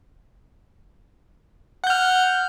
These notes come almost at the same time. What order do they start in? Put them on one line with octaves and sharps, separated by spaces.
F#5 G6 F6